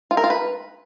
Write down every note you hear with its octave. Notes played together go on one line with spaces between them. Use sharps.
F4
A#4
F4
B4